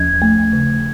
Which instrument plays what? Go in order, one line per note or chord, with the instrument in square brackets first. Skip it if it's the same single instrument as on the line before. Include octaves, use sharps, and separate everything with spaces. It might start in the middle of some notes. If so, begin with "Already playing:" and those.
Already playing: [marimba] D#2 F3 [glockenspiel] G#6
[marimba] A3
C#3